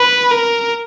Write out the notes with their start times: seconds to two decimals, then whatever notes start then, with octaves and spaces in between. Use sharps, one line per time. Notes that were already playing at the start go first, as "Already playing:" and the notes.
Already playing: B4
0.31 A#4